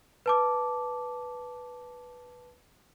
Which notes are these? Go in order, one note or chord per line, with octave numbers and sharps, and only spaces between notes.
B4 A5 D6